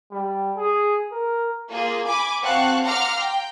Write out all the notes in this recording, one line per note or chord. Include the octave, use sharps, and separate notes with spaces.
G3
G#4
A#4
A#3 F4 G#4
G#5 B5 D6
C4 F#4 F5 A5 C#6 F#6
F5 F#5 A#5 C6 D6 F6
G5